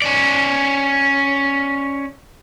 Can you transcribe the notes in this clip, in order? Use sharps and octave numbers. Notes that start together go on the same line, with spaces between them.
C#4 D5